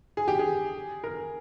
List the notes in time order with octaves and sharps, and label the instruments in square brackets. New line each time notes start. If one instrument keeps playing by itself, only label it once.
[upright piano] G#4
G4
G#4
A#4